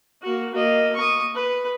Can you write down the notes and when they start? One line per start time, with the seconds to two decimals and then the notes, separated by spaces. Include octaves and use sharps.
0.22 A#3 F#4
0.54 A#3 D#5
0.96 C#6 D#6
1.35 B4